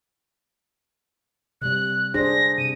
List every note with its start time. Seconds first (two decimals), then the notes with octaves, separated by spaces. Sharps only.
1.62 C3 G3 F#6
2.14 D4 G#4 C5 A#6
2.58 C3 D#7